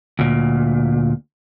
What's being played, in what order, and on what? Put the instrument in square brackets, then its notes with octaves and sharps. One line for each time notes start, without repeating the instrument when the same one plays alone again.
[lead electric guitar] D2 A#2